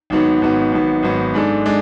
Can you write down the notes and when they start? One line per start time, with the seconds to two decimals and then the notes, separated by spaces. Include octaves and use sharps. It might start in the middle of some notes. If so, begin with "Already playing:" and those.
0.10 G#1 G#2 F#3 B3
0.41 G#1 G#2 F#3 B3
0.72 G#1 G#2 F#3 B3
1.03 G#1 G#2 F#3 B3
1.33 G#2 G#3 D4 A4
1.66 G#3 D4